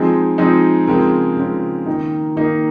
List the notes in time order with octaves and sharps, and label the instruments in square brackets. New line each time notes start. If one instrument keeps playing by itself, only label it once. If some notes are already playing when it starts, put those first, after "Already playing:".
Already playing: [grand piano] F3 G#3 C4 D#4 G#4
F3 G#3 C4 D#4
C#3 F3 G#3 C4 A#4
C#3 F3 G#3 C4
D#3 A#3 D#4
D#3 A#3 D#4